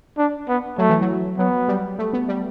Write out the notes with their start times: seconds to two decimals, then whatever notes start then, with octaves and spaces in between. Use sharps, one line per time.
0.17 D4
0.48 B3
0.78 F#3 A3
0.90 E3
1.01 F#3
1.38 F#3 B3
1.68 G3
1.99 A3
2.13 B3
2.29 G3